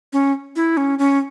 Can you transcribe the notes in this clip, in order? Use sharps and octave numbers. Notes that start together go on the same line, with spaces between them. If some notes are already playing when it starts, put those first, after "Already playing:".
C#4
E4
C#4
C#4